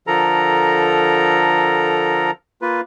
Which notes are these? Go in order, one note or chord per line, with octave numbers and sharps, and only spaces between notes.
D3 F3 A4 A#4 A#5
A#3 F4 B4